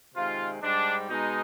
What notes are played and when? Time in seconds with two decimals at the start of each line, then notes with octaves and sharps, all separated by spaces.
0.15 C3 D#3 G#3 F4
0.62 G#2 G3 D4
1.08 B2 G#3 D#4